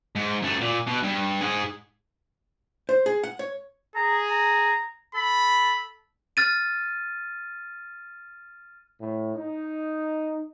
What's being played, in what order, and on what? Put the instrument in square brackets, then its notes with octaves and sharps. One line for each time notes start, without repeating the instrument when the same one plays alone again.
[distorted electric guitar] G#2
F#2 A3
A#2
B2
G2
G#2 G#4
[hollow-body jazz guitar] C5
G#4
F#5
C#5
[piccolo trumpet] G#4 [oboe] A#5
[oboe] A#5
[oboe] A4 [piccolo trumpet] B5
[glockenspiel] F6 A6 D#7
[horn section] A2
D#4